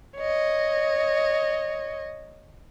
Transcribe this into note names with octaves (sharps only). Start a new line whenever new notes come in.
C#5 D#5